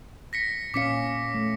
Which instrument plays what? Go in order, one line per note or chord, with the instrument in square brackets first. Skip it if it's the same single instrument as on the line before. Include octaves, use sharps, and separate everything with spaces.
[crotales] A#6 B6 C#7
[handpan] A#2 C#4 F5 [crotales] D6 B6 C#7
[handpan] A3